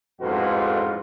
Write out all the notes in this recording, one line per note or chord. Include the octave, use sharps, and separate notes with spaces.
A1 F2 G#2 F4 F#4 B4